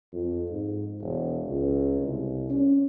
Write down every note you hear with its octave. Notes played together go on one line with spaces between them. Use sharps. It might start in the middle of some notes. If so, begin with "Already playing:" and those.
F2
G#2
E1
C#2
C2
C#4